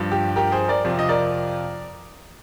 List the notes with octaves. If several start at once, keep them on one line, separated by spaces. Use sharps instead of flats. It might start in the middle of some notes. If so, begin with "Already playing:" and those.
Already playing: G2 F3
G4
G4 A#4
G#4 C5
A#4 D5
F2 C3 F3
D#5
A#4 D5